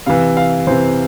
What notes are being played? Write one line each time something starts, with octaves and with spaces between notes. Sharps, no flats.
C3 E3 F5
F5
C3 E3 C5